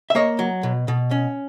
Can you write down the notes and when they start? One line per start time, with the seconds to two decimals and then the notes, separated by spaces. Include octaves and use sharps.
0.10 E5
0.15 A#3 C#5 D#5
0.39 F#3
0.63 B2
0.88 B2
1.11 C#4